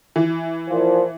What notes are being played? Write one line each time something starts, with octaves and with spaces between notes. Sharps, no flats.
E3
A#2 F3